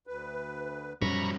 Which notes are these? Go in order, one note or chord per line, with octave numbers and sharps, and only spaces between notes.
D2 B4
F#2 B2 F3 G3 C#4 A#5 B5 C#6